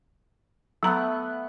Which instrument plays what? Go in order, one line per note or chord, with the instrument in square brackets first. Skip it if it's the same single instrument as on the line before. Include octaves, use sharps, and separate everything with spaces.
[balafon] F#3 A#5 [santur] A3 B3 F#5